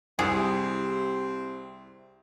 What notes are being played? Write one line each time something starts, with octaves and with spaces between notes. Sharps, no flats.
C2 C4 E4 G4 G#4